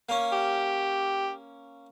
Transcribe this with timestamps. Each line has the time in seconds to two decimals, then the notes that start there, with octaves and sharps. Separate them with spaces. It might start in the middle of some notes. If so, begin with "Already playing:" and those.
0.09 A#3 C#4
0.33 G4